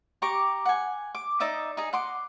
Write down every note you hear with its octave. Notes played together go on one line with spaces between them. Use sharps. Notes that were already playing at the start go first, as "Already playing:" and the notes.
G4 A#5 C#6 D6
F#5 G#5
D6
D#4 D5 E5 D#6
D#4 G#4
F#5 C6 D6